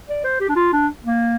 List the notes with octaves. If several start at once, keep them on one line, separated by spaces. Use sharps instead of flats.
D5
C5
G4
D4
F4
D4
A#3